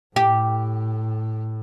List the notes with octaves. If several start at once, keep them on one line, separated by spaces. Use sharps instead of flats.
A2 G4